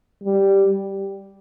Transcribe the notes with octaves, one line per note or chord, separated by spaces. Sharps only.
G3